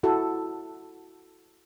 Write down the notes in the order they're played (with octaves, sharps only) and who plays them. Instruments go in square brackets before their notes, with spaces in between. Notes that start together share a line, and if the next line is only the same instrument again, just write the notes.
[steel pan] E4 F#4 A4